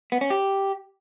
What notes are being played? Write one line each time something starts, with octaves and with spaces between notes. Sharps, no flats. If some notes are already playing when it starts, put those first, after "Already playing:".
B3
C#4
G4